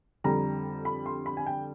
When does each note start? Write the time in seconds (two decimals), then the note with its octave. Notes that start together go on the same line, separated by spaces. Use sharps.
0.24 F2 D3 G3 A#5
0.85 B5
1.06 C6
1.26 B5
1.37 G#5
1.47 G5